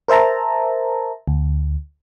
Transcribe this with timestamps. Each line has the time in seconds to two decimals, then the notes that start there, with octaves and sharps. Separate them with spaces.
0.08 A#4 C5 E5 A5 A#5
1.28 D2